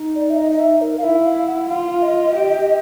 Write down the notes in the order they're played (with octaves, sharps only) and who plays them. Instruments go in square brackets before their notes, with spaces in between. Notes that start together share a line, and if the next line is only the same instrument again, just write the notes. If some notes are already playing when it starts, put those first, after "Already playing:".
Already playing: [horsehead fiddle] D#4
[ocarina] D5
E5
D#5
D#5
E5
A#4
F5
[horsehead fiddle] E4 [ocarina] E5
[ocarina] F5
F#5
[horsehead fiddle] F4 [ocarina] F5
[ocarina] D#5
[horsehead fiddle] G4